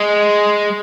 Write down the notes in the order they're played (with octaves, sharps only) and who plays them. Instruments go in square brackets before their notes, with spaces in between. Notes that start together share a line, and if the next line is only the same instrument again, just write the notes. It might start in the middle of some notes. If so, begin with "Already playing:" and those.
Already playing: [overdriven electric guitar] G#3